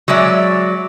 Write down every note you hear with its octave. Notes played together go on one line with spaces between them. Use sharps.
F#3 G#3 D5 E5